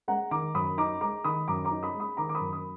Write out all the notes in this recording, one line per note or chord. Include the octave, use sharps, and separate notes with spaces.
G#3 F#5 A#5
D#3 A#5 D6
F#2 B5 D#6
D#4 A#5 D6
G#3 A#5 D6
D#3 B5 D#6
F#2 A#5 D6
A#5 D6
D#4
B5 D#6
G#3
B5 D#6
D#3 A#5 D6
D6
B5 D#6
F#2
B5 D#6